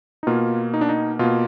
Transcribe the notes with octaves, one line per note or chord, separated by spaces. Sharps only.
D#4
B2 A#3 F4
D#4
D4
D#4
B2 A#3 F4